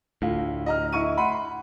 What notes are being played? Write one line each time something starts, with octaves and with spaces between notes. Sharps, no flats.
D2 A2 F4
D#5 A#5 F6
E4 C#6 D#7
F#5 B5 C6